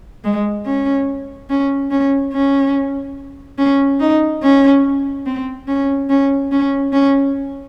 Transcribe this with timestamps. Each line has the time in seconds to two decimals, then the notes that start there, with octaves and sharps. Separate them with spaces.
0.24 G#3
0.66 C#4
1.50 C#4
1.91 C#4
2.33 C#4
3.58 C#4
4.00 D#4
4.42 C#4
5.26 C4
5.68 C#4
6.09 C#4
6.51 C#4
6.93 C#4